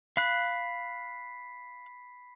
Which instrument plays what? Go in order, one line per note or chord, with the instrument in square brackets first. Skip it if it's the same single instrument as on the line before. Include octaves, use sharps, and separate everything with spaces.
[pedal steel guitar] F5 F#6 [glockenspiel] B5 B6 C7